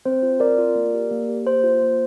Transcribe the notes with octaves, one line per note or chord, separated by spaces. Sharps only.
C4 C5
F4
C4 A#4 D5
F4
A#3
G4
A#3
G4
A#3 C5
F4
A#3